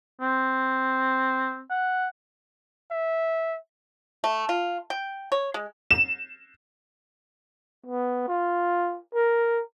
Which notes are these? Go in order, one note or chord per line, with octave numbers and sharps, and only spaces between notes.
C4
F#5
E5
A3
F4
G5
C#5
G#3
E7
B3
F4
A#4